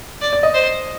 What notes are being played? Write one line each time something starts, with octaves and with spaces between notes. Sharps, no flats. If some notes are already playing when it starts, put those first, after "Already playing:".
D5
D5
D#5
C5